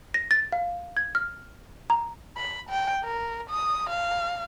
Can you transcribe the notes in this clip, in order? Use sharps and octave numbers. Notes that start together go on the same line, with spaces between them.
A#6
A6
F5
G#6
F6
A#5
B5
G5
A#4
D#6
F5